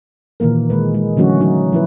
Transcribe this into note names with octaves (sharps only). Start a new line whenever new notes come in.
A#2 D#3 E3 A#3 A#4
D#3 G#3 B4
G#3
D3 E3 F#3 A3 C#4 F#4
F#3 D#4 F#4
F3 E4 B4